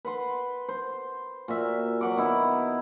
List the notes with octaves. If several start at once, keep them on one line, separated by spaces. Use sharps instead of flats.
B4 F#5 C6
C5
A#2 F#4 E5
F#3 F#5 D6
D#3 B3 E4